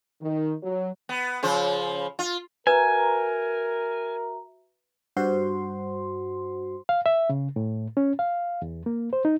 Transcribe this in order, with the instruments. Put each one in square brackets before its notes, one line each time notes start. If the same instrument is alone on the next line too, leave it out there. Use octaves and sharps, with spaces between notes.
[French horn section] D#3
F#3
[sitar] B3
C#3 F3 C5
F4
[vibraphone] F#4 E5 A#5 [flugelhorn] A#4 [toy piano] B4 [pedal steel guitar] G#5
[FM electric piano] G2 F#4 C5 C6
[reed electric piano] F5
E5
C#3
A2
C#4
F5
E2
A#3
C5
D#4